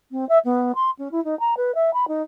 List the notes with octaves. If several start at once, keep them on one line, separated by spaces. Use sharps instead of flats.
C4
E5
B3
C6
C#4
E4
D#4
A#5
B4
E5
B5
D#4